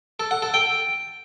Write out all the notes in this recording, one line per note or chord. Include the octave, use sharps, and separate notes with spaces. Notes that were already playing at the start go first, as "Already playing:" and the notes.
A4
F#5
A4
G5